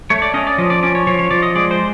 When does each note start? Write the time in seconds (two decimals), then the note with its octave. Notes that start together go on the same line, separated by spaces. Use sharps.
0.10 A3 C#5
0.22 D5
0.34 C#4 D#5
0.47 D5
0.58 F3 D#5
0.70 D5
0.83 C#4 D5
0.95 C#5
1.07 F3 C#5
1.19 C#5
1.31 F3 D5
1.43 D#5
1.56 G#3 D5
1.71 C5